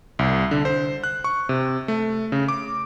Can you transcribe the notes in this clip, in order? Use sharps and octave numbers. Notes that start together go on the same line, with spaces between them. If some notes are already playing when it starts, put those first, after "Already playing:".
C2
D3
C5
F#6
C#6
C3
A3
C#3
D6